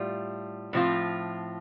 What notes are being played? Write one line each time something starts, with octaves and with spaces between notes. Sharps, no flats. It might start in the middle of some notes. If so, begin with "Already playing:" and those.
Already playing: A2 G3 F4
A2 F3 C4 F4